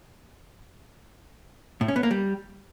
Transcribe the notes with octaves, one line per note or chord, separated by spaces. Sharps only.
A2
C#4
B3
A#3
G3